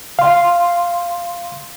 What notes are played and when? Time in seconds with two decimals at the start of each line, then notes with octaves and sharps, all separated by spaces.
0.19 F5 C6